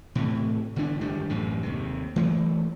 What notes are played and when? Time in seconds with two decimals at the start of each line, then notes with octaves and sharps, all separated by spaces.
0.15 A2 C3 E3
0.76 G1 D3 E3 D4
1.01 G#1 F#2 G3 D4
1.29 A1 F#2 A2 C3
1.63 D#2 C3
2.16 E3 F#3 A3 A#3